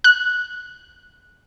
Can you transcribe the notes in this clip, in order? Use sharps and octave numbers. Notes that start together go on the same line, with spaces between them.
F#6